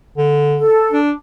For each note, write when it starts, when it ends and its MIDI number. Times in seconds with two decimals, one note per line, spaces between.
0.17 0.63 50
0.58 0.98 69
0.92 1.12 62